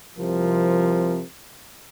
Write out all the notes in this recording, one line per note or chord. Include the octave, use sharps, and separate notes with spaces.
C2 C3 F3 A#4